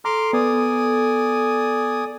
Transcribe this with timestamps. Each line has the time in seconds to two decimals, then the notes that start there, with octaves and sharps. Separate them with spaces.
0.05 A4 A#5 C6 D6 F6
0.33 B3 D5 G#5 D#6